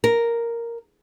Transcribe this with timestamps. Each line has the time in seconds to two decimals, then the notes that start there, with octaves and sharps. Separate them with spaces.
0.04 A#4